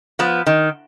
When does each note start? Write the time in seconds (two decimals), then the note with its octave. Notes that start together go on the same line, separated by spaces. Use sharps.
0.19 F3 B3
0.47 D#3